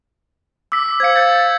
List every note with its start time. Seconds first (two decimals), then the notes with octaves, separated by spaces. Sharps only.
0.72 D6 E6 B6
1.00 C5 F5 G#6 C#7
1.16 G6 A6